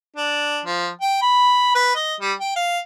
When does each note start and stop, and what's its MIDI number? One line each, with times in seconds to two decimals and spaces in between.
0.16 0.60 62
0.65 0.88 53
1.02 1.21 79
1.22 1.74 83
1.75 1.92 71
1.95 2.14 75
2.21 2.32 55
2.40 2.52 79
2.56 2.78 77